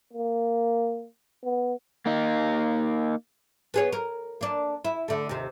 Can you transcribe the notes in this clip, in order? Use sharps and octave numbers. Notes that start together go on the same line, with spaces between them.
A#3
B3
A#3 D#4
B3 G#4 C#5
A#4
A#3 D4
E4
D3 A3
D#2 C3